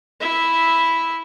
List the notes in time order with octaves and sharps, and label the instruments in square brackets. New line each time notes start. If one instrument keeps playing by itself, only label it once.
[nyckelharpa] E4 E5